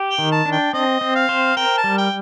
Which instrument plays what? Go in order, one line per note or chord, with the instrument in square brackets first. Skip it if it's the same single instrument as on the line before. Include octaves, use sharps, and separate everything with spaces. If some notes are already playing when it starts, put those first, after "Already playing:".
Already playing: [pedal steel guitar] G4
[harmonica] G5
[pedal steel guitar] D#3
[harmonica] A5
[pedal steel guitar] D4
[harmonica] G5
[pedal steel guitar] C4 [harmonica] D#5
[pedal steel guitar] C4
[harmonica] F5
[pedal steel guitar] C5
[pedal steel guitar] A#4 [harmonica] G5
[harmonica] A5
[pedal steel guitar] G3
[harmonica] G5